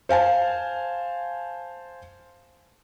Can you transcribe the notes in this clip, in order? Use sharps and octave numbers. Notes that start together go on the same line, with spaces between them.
C5 F5 G#5 A5